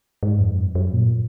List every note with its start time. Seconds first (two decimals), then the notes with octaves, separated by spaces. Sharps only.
0.23 G#2
0.40 F2
0.58 F#2
0.75 F#2
0.93 A#2